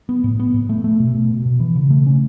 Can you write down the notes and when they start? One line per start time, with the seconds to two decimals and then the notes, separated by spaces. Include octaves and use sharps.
0.09 B3
0.24 A2
0.39 B3
0.54 A2
0.69 A3
0.84 A3
1.00 B2
1.15 B2
1.31 B2
1.46 B2
1.60 E3
1.76 C#3
1.90 A3
2.06 C#4